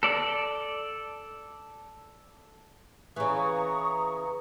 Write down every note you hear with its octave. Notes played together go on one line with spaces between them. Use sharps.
A4 D5
C#3 E3 A#5 C#6 D#6